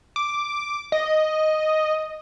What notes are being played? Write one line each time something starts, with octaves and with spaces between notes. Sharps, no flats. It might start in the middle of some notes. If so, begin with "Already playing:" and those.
D6
D#5